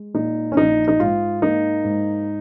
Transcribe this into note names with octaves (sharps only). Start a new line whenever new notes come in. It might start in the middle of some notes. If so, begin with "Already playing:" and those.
Already playing: G#3
A#2 D#4
C#4
A#1 D#4
D#4
G#2 F4
A#3 D#4
G#2